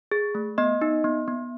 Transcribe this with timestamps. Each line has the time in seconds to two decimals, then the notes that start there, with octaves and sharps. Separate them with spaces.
0.12 G#4
0.35 A3
0.58 B3 D#5
0.81 D#4
1.04 B3
1.28 B3